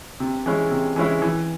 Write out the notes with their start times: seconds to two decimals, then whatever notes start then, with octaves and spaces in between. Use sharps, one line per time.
0.20 C3
0.46 E3 G#3 C#4 E4
0.71 C3
0.96 E3 G#3 C#4 E4
1.22 E3